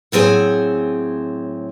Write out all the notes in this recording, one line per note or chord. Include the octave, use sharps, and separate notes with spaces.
A2 F#3 C4 G#4 G#5